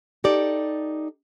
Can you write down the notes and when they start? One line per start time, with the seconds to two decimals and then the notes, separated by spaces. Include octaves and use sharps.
0.24 D#4 G4 A4 D5